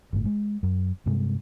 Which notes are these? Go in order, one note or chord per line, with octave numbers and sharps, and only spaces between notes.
G1 A2
G#3
F#2
G2 C3 G#3